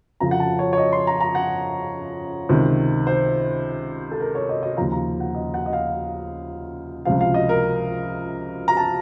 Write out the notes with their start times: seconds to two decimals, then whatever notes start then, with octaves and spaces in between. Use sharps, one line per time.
0.20 F2 C#3 F3 A#5
0.31 F#5
0.40 A5
0.59 C#5
0.73 C#5
0.78 D#5
0.93 C6
1.07 A#5
1.21 A#5
1.35 F#5
2.49 C#2 C3 D#3
3.07 C5
4.11 A4
4.20 A#4
4.35 C#5
4.49 D#5
4.63 D#5
4.77 D#2 C#3 F3 A#5
4.92 A#5
5.20 F#5
5.35 D#5
5.54 F#5
5.66 D#5
5.73 F5
7.05 C#2 C3 F3 F5
7.21 F5
7.34 D#5
7.49 A#4
8.68 A#5
8.77 A5